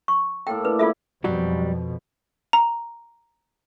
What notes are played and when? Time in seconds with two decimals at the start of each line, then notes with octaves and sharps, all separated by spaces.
0.08 C#6
0.47 A2 A#3 A4 G5
0.65 D4 B4
0.79 A#3 E4 F4 A4 E5
1.24 F2 B2 F#3 G3 F#4
2.53 A#5